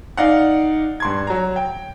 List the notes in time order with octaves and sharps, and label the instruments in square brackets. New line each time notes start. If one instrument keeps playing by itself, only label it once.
[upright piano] D#4 D5 F5 F#5
G2 C6 G#6
F#3 A#5
G5